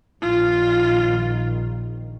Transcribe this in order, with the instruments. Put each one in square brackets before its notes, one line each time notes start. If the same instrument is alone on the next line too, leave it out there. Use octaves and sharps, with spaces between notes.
[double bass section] A#1 D#3 [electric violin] F4